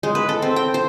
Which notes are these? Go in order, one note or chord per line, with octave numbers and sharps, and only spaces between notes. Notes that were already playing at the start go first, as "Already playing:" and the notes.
G#3
B4
A4
C4
G5
C5